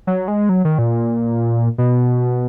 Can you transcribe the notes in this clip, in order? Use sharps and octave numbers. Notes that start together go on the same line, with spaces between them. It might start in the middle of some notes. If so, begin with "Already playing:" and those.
F#3
G#3
F#3
D#3
A#2
B2